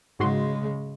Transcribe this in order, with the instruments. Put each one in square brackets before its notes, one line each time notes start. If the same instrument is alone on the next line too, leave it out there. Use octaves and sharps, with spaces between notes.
[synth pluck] G#2 F#4 C6 [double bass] C#3 G#3